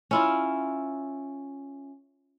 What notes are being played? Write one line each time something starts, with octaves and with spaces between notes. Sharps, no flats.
C#4 E4 F4